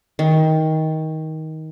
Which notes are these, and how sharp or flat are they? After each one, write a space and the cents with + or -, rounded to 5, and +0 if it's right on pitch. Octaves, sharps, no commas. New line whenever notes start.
D#3 +20